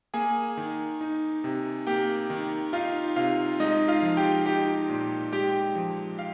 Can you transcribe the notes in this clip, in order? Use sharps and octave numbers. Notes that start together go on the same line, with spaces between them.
A#3 G#4 G#5
D#3
D#4
C3
A#3 G4 G5
D#3
D#4 F4 F5
C3 F4 F5
G#3 D#4 D#5
F4 F5
F3
G4 G5
D#4 G4 G5
A#2
G#3 G4 G5
F3
F5